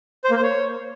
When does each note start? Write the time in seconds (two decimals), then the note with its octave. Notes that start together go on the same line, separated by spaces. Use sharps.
0.24 C5
0.30 A#3
0.37 C5
0.43 C#5